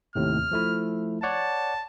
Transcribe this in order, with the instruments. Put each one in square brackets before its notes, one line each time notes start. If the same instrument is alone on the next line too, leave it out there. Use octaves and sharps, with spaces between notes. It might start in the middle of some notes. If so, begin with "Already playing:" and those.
[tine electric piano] D#2 A2 C3 [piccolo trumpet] F6
[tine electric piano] F3 A3 E4
[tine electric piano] C#5 D5 F#5 [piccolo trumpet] A5